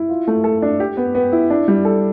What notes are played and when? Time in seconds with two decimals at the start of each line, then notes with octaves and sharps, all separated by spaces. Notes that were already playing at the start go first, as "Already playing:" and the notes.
Already playing: E4
0.10 F4
0.28 A3
0.44 A4
0.62 D4
0.80 G4
0.97 B3
1.15 B3
1.32 E4
1.50 D4
1.68 G3
1.85 A4